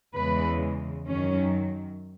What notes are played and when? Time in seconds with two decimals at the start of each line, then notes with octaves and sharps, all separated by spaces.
0.15 E2 C#3 E3 G#3 B4
1.07 F#2 D#3 F#3 C#4